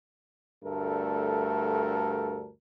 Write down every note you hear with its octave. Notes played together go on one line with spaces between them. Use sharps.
D2 G2 A3 A4 A#4